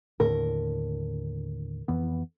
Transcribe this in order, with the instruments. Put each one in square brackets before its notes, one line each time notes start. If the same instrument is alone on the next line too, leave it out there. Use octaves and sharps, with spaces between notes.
[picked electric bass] D#2 A2 D3 [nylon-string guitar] A#4
[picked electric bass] F2 E3 B3